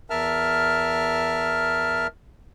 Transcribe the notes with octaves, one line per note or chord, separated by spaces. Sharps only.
E2 A#4 E5 A5 F6